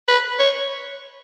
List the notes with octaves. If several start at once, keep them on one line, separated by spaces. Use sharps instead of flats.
B4
C#5